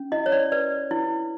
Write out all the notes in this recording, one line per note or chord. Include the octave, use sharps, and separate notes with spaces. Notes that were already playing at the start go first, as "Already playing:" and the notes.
Already playing: C#4
E4 D#5
C#5
D5
B4 D5
E4